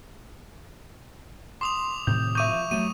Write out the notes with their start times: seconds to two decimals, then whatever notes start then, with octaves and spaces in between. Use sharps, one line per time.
1.61 C6 D6 D#6 F7
2.07 A2 C3 D#3 G6
2.35 E5 C#6 D6 G6 D#7
2.49 F3
2.71 F#3 A3 D#7